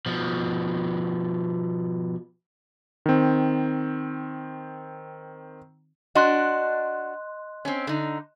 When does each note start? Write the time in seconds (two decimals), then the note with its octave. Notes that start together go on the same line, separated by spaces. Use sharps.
0.06 B2 F3
3.06 D#3 C4
6.15 D4 F#4 D#5 C6 F#6
7.65 C4 C#4
7.87 D3 D#4